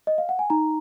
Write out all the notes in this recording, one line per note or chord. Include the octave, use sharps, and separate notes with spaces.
D#5
F5
F#5
G#5
D#4 A#5